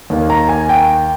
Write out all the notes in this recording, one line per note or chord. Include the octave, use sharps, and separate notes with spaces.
D#2 D#3 A#3
A#5
G#5
G5